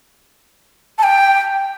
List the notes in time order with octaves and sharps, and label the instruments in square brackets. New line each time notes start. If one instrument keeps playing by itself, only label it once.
[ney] A5
G5